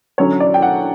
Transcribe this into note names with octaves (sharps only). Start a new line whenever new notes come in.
D3 F#3 C#4 C#5
D5
G5
F#5